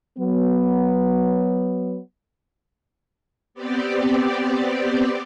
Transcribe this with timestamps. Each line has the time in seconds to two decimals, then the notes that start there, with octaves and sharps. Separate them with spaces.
0.18 F#3 B3
3.54 B3 C4 G4 D5